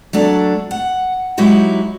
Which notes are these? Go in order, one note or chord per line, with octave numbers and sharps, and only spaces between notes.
F#3 A3 D4
F#5
F#3 G#3 D#4 E4 F#4 G4